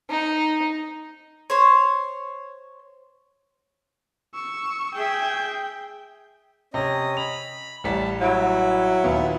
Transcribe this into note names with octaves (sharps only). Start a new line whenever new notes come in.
D#4
C5 C#5
C#6 E6
G#4 E5 G5
C3 C#4 D#5
B5 F7
A1 G3 A5 B6
F#3 E4
D#2 A#2 B3